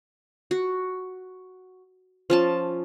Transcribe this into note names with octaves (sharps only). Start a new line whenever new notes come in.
F#4
F3 C#4 A5